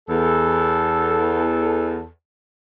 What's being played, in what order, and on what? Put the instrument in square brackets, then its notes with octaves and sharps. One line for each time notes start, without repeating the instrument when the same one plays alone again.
[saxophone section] E2 A4